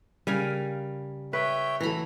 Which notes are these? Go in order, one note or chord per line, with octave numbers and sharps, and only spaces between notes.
C#3 G3 A#4 F5 G#5
B4 C#5 E5 G5
E3 F#3 A3 A#5 B5